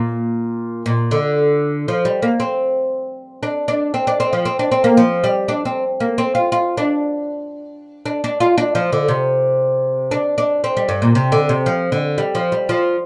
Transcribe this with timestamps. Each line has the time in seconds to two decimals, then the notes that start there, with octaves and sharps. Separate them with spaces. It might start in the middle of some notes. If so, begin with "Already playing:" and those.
Already playing: A#2
0.86 A#2
1.11 D3
1.88 F3
2.05 G3
2.22 A#3
2.40 C4
3.43 D4
3.68 D4
3.94 C4
4.07 D4
4.20 C4
4.33 F3
4.45 C4
4.59 D4
4.72 C4
4.84 A#3
4.97 F3
5.24 G3
5.48 D4
5.65 C4
6.00 A#3
6.18 C4
6.35 F4
6.52 F4
6.77 D4
8.06 D4
8.24 D4
8.40 F4
8.58 D4
8.75 F3
8.92 D3
9.08 C3
10.11 D4
10.38 D4
10.64 C4
10.77 G3
10.89 G2
11.02 A#2
11.15 C3
11.32 D3
11.49 C3
11.66 F3
11.92 D3
12.18 G3
12.35 F3
12.52 G3
12.69 F3